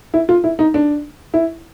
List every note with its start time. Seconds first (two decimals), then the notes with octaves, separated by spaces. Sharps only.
0.14 E4
0.29 F4
0.44 E4
0.59 D#4
0.74 D4
1.34 E4